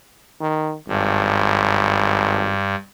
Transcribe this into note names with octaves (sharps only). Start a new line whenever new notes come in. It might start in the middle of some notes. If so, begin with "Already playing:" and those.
D#3
G#1 G2